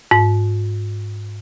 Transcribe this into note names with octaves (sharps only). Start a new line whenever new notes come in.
G#2